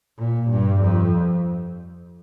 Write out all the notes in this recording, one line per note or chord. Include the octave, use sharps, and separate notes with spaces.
A#2
G2
F2